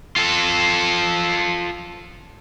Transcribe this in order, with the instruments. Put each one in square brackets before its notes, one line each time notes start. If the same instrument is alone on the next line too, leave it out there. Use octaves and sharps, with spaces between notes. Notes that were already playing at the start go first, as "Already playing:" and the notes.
[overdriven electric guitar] F4 A4